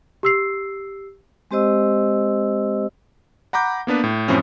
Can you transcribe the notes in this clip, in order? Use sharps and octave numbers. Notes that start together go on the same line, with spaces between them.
G4 E6 C7
G#3 C4 G4 C5 D#5 E6
F#5 A#5 B5 D6 G6
A#3 B3 D4 B4
A2
F#2 A2 F3 A3 C4 C#4